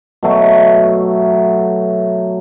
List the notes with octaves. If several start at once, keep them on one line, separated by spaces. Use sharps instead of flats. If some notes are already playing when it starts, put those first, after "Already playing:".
B2 F#3 A3